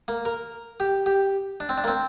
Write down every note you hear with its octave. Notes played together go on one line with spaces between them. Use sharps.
A#3
A#4
G4
G4
D4
C4
D4
A#3
C4